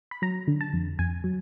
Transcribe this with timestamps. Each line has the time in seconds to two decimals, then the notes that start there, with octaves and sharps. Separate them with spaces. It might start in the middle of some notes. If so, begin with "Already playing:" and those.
0.11 B5
0.22 F#3 A#5
0.47 D3
0.61 A5
0.73 F2
0.99 F2 G#5
1.24 F#3